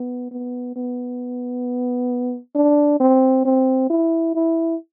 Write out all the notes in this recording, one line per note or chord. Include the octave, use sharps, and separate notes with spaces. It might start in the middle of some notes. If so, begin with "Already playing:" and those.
Already playing: B3
B3
B3
D4
C4
C4
E4
E4